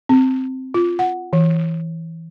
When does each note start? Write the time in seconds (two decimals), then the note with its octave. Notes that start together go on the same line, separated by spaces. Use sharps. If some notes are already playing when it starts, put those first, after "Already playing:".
0.09 C4
0.74 F4
0.99 F#5
1.33 E3